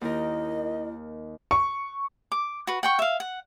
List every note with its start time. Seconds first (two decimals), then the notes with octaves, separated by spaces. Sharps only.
0.01 D#2 D#3 E4 A#4 D#5
1.51 C#6
2.32 D6
2.67 F#4 B4
2.83 F#5 G5 C#6
2.99 E5 F5
3.20 F#5